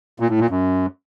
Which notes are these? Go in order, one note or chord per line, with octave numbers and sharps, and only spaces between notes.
A#2
A2
A#2
F#2